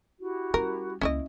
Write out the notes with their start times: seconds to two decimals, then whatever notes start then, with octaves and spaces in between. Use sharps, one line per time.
0.19 E4 F#4 G4
0.54 G3 C#4 A#4
1.01 C#2 A#3 C#4 E4 D#5